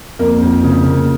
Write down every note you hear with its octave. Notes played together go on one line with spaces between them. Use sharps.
F2 A#3 A#4
F2
C#3
A#3